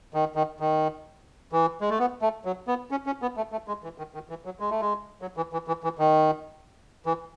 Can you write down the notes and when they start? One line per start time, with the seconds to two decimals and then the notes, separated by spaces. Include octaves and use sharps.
0.14 D#3
0.35 D#3
0.60 D#3
1.52 E3
1.81 G#3
1.90 A3
1.99 B3
2.22 A3
2.45 F#3
2.67 B3
2.91 C#4
3.06 C#4
3.22 B3
3.37 A3
3.52 A3
3.68 G#3
3.84 E3
3.98 D#3
4.14 D#3
4.30 E3
4.45 F#3
4.60 G#3
4.71 A3
4.81 G#3
5.22 F#3
5.37 E3
5.53 E3
5.68 E3
5.84 E3
5.99 D#3
7.06 E3